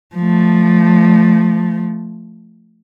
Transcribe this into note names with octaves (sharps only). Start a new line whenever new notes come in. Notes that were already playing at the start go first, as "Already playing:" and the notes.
F3 A3